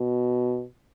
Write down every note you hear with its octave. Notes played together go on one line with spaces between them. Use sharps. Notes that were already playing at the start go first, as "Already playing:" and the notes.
Already playing: B2